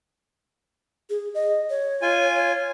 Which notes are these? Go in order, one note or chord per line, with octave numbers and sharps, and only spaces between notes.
G#4
D#5
C#5
F4 G#5